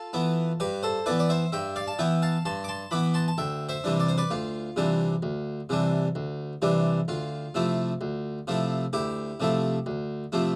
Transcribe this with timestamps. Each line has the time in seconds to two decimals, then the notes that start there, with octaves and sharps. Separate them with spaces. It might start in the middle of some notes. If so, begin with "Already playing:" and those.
Already playing: F4 A4
0.13 E3 B3 E4
0.60 G2 G4 B4
0.83 A4 C5
1.06 E3 B3 E4 B4 D5
1.19 D5
1.29 C5 E5
1.52 G2 E5 G5
1.76 D5 F5
1.88 A5
1.99 E3 B3 E4 E5 G5
2.22 F5 A5
2.45 G2 A5 C6
2.64 D6
2.68 A5 C6
2.91 E3 B3 E4 B5 D6
3.14 A5 C6
3.28 A5
3.38 D2 E5 G5
3.69 C5 E5
3.84 C3 E3 G3 D4
4.00 D5
4.09 C5
4.18 B4 D5
4.31 D2 F4
4.76 C3 E3 G3 D4
5.23 D2
5.69 C3 E3 G3 D4
6.15 D2
6.62 C3 E3 G3 D4
7.08 D2 F4
7.55 C3 F3 A3 E4
8.01 D2
8.47 C3 F3 A3 E4
8.93 D2 E4 G4
9.40 C3 F3 A3 E4
9.86 D2
10.32 C3 F3 A3 E4